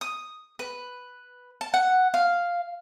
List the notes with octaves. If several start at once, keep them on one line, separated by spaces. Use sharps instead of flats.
D#6
B4
A5
F#5
F5